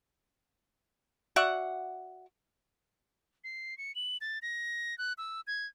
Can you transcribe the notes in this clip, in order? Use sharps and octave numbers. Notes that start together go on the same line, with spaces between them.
F#4 D5 E5 F#5
C7
C#7
F#7
A6
A#6
F#6
E6
G#6